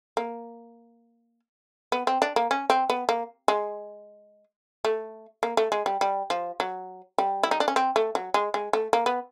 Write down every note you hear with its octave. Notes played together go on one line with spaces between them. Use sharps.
A#3
B3
C4
D4
A#3
C#4
C4
B3
A#3
G#3
A3
A#3
A3
G#3
G3
G3
F3
F#3
G3
E4
D#4
D4
C#4
C4
A3
F#3
G#3
G#3
A3
A#3
B3